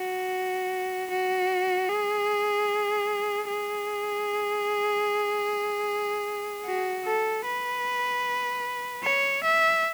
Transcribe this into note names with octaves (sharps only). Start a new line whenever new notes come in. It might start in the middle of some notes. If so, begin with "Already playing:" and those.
Already playing: F#4
F#4
G#4
G#4
F#4
A4
B4
C#5
E5